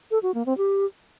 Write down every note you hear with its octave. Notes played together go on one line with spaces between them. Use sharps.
A4
F#4
A#3
C4
G4